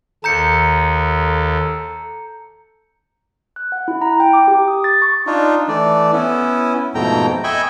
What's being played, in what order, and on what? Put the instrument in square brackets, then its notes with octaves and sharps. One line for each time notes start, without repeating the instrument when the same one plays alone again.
[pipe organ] D#2 [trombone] A4 [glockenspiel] A#5 G6 C#7
[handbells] F#6
F#5
E4
A#5
G5
D6
G4
D#6
A6
C#6
[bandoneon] D4 D#4 F4
E3 A3 D5
B3 C#4 E4
F2 G#2 B2 A3 G5 A#5
D#5 E5 G5 G#5 B5 C#6